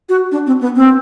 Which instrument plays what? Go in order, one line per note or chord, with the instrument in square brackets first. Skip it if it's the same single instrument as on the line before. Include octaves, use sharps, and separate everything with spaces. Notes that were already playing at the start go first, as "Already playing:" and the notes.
[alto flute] F#4
D4
C4
B3
C4